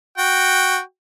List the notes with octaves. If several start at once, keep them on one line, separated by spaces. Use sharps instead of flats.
F#4 G5